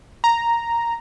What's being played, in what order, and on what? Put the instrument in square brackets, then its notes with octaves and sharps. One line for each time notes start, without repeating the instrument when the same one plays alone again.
[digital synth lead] A#5